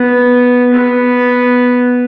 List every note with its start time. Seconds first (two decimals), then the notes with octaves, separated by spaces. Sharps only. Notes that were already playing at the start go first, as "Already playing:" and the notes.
Already playing: B3
0.73 B3